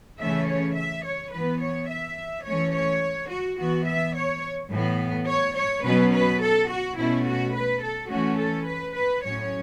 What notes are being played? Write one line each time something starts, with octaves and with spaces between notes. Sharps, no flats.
C#3 E3 A3 C#4 E5
C#5
E5
C#5
E3 B3 B4
C#5
E5
E3 A3 C#4 C#5
C#5
F#4
E3 B3 F#4
E5
C#5
A2 E3 B3
C#5
C#5
B2 F#3 C#4 B4
B4
A4
F#4
B2 A3 C#4 E4
F#4
B4
A4
E3 A3 C#4 F#4
A4
B4
B4
A2 F#3 C#4 C#5